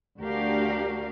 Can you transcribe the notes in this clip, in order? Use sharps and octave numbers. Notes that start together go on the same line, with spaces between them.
D2 D4 F#4 G4 A#4 F5